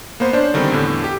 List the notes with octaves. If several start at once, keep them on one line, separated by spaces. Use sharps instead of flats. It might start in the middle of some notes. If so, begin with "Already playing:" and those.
A#3 B3 C5
C#4 D4 C5
D3 D#3 G3 B3 C4
E2 A2 D3
G4